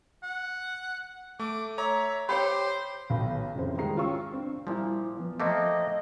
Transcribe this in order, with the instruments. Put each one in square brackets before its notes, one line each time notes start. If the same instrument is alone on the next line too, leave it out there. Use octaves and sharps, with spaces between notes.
[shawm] F#5
[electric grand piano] A3 [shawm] D6
[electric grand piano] C#5 A#5 [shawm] E5
[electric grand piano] G4 D6 [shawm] C5 [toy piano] C#5 G5 B5
[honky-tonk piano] B1 D#3 B5
C2 F2 C#3 C5
D#3 G3 G#3 A#5 C7
C#4 F4 G5 C#6 E6
[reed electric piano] C4 D4
[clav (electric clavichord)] A#2 F3 [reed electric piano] G3 E4
[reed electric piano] F3 B3
[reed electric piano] F3 D6 [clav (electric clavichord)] A3 A#3 C4 [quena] D#5